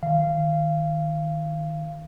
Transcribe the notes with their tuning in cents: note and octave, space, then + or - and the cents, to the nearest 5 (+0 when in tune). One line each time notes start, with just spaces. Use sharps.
D#3 +0 F5 -20